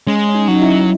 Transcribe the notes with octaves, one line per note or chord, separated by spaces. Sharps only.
G#3 C#4
C#4
D#4
F#3 D#4
E4